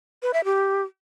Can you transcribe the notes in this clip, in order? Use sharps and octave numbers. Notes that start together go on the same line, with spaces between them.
B4
E5
G4